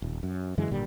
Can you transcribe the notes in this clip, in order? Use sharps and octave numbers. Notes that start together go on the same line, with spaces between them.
D#1
F#2
F#2 D3 E3 G#3
G#1 A#2 D3 G3